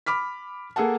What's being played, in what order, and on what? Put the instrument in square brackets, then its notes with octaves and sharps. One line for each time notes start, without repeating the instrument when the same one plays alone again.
[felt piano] B5 D6 F6 B6
A#3 G#4 A4 F#5 A5